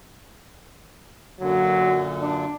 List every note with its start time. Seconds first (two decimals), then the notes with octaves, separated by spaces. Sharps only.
1.40 F#2 A#2 D3 F#3
2.21 D4